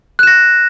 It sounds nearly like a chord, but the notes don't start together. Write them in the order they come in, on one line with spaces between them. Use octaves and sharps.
F#6 E7 A#6